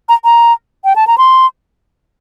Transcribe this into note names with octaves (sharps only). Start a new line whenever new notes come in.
A#5
A#5
G5
A5
A#5
C6